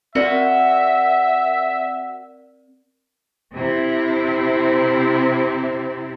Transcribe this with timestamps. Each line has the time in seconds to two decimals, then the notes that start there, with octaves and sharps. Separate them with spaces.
0.15 C4 F#4 A#4 D5 E5
3.53 C3 C4 E4